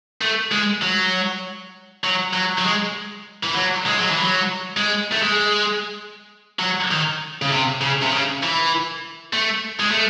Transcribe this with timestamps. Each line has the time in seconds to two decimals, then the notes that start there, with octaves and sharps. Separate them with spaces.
0.21 A3
0.52 G#3
0.83 F#3
2.04 F#3
2.34 F#3
2.59 F#3
2.64 G#3
3.44 E3
3.56 F#3
3.87 G#3
3.98 F#3
4.11 E3
4.24 F#3
4.77 G#3
5.13 A3
5.23 G#3
6.59 F#3
6.91 D#3
7.42 C#3
7.52 C3
7.81 C#3
8.02 C3
8.12 C#3
8.43 E3
9.33 A3
9.80 G#3
9.91 A3